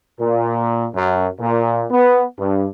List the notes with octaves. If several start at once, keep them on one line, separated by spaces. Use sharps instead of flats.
A#2
F#2
A#2
B3
G2